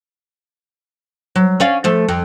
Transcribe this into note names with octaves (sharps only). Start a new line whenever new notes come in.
F#3
C#4 D5 F5
F3 A3
F2